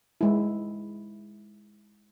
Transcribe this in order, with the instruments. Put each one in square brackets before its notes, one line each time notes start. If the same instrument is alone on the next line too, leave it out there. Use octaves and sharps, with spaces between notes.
[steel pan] G#3 E4